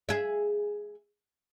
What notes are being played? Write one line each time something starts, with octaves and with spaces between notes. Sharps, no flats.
G#4 E5